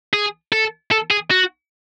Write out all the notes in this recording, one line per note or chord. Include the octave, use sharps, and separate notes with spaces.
G#4
A4
A4
G#4
F#4